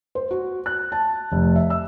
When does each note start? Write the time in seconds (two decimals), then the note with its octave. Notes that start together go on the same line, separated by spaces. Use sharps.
0.15 C5
0.31 F#4
0.66 F#6
0.92 A5
1.32 F1
1.56 E5
1.70 E6